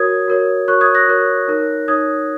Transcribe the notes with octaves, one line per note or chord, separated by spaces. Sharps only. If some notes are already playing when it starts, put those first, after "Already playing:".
Already playing: F#4 A#4 C#5 D#6 G#6
F#4 A#4 C#5
F#4 A#4 C#5 C#6 F#6
D#6 G#6
F#6 A#6
F#4 A#4 C#5
D#4 A#4 C#5
D#4 A#4 C#5 D#6 G#6